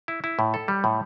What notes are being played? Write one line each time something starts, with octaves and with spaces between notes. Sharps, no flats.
E4
E4
A2
A4
G3
A2